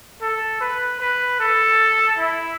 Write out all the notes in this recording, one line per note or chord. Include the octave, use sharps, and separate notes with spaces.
A4
B4
B4
A4
E4